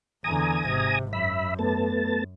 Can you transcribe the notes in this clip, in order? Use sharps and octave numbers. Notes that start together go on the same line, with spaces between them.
E2 D3 G#5 A#5 D#6
G#1 C3
F#2 E5 B5
A3 B3 A5